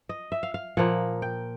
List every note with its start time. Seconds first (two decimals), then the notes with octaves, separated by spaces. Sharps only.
0.09 D#5
0.32 E5
0.43 F5
0.54 F5
0.77 A#2 F3 A#3 F#5
1.22 G5